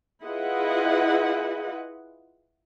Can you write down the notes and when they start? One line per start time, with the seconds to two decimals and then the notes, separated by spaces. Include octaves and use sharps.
0.25 E4 F4 G#4 B4 D#5 F#5